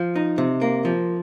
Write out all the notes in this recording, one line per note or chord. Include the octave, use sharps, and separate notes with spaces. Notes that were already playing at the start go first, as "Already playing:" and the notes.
Already playing: F3
D#4
C3
A#3
F3